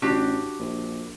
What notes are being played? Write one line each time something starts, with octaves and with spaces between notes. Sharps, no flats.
A1 D4 F#4 G4
A#1